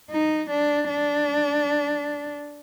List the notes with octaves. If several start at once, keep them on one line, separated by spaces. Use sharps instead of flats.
D#4
D4
D4